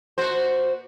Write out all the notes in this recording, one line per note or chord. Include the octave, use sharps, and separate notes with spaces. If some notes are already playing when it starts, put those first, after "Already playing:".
A#2 F#4 C5